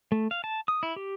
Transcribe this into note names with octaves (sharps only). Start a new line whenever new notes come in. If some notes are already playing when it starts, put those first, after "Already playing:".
A3
F5
A5
D#6
E4
G4